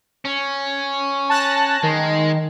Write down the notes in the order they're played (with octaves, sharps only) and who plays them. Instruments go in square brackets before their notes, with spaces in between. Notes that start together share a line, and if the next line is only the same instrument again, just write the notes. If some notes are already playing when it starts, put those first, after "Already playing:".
[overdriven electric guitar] C#4
[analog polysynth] A5 F#6 A#6
[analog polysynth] D#3 [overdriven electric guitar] G#3